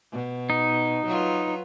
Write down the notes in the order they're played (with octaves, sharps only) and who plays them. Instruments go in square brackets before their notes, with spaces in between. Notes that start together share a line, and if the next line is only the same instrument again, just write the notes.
[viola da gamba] B2
[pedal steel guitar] D#4
[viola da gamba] F#3 F4 B4